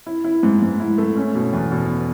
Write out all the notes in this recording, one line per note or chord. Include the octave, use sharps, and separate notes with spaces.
E4
E4
G#2
G#2
E4
A3
C#4
B2
E2
B2